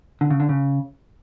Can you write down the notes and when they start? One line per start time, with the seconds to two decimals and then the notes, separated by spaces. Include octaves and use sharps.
0.21 D3
0.30 C#3
0.40 D3
0.49 C#3